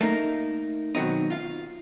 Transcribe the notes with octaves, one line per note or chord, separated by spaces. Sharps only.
A3 A#3 D#4 A#4
B2 D#3 F#3 C4 D#4
F4 F5